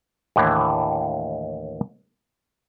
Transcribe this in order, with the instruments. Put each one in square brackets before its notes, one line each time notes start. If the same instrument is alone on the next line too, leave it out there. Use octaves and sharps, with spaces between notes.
[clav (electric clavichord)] D#2 A2 D3 E3